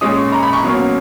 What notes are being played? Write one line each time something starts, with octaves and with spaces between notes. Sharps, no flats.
A#2 G#3 C#4 D#6
C#6
A#5
B5
C#6
B2 F#3 A#3 C#4